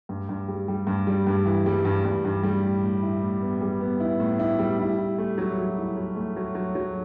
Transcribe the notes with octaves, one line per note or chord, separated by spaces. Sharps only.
G2
G2
G3
G3
G2
G3
G2
E3
G3
G2
G2
G2
G3
A2
A2
E4
A2
B3
G3
B3
E4
A2
E4
G3
E4
E4
A3
F#3
F#3
E4
F#3
A3
F#3
F#3
F#3